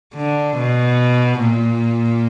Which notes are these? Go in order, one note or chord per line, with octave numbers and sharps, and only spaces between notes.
D3
B2
A#2